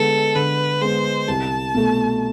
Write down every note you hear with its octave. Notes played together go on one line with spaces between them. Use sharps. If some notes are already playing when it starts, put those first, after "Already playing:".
Already playing: D3 G#3 B3 A4
D3 B4
G#3 B3 C5
C2 A5
B2 A3